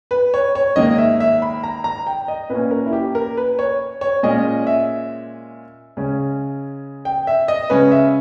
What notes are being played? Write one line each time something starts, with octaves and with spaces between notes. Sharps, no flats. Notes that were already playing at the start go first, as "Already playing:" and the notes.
B4
C#5
C#5
G#2 D#3 A#3 D#5
E5
E5
B5
A#5
A#5
G5
D#5
A#2 A#3 C#4 B4
A#4
E4
G4
A#4
B4
C#5
C#5
A#2 G#3 C#4 D#5
E5
C#3 G#3 C#4
G5
E5
D#5
C#3 G#3 C#4 B4
E5